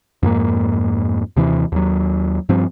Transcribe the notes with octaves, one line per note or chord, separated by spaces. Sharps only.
F2 G#2 A#3
D#2 C3 E3
D#2 F#3
G2 F3 C4